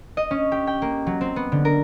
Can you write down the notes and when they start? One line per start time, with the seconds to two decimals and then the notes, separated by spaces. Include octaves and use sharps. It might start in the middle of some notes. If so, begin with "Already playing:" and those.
0.17 D#5
0.31 C#4
0.52 G4
0.67 G5
0.82 A#3
1.07 F#3
1.21 C4
1.36 B3
1.52 D3
1.65 A#4